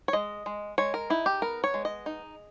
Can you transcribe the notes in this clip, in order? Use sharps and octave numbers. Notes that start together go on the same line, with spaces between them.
C#5
G#3 D#5
G#3
G#3 C#5
A#4
D#4 E4
G4
B3 A#4
C#5
G#3
D#5
D#4